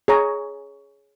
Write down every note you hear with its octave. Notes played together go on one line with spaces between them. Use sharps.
G#4 C#5 A#5